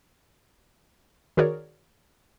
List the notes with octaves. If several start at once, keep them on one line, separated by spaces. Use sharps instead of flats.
D#3 F#4 G#4 A#4 C#5 D5